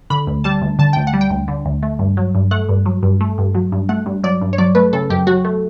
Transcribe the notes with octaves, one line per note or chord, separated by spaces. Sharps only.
D3 B5
D2
G3 A5
D2
D3 A5
D2 G5
F#5
G3
G5
D2
D3
D2
A3
G2
F#3
G2
A3 F#5
G2
F#3
G2
A3
G2
F#3
G2
A3 F#5
G2
F#3 D5
G2
C#5
F#3 D5
A3 B4
C#3 A4
F#2 G4
F#3 F#4
A3